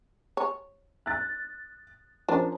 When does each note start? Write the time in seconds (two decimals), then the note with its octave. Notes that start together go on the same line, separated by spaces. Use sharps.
0.37 C#5
1.06 F#6 A6
2.28 F3 C#4 D4 A#4